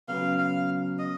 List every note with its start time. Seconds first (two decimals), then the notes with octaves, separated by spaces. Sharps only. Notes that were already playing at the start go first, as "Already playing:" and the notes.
0.08 C#3 F#3 B3 F5
0.38 F5
0.99 D#5